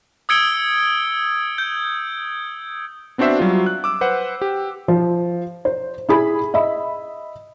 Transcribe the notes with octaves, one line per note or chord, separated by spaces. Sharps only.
D#6 E6 G#6 C#7 D7 G7
G6
B3 C4 D4 F#4 C5 E5
F#3 G3 F4
F#6
D6 E6
B4 C5 F#5
G4
F3
C5
E4 G#4 B5
D#5 E5 B5